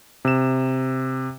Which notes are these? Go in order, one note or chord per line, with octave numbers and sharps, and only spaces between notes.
C3 E7